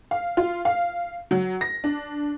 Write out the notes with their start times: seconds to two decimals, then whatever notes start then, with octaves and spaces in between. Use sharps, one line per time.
0.11 F5
0.37 F4
0.65 F5
1.31 F#3
1.61 A#6
1.84 D4